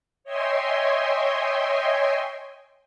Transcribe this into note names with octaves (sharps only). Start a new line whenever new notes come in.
C#5 D#5 E5 G5 G#5 C6